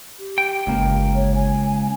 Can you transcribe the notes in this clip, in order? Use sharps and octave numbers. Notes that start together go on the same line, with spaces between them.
G4
G5
G1 C#2 A#3 G5
C#5
G#5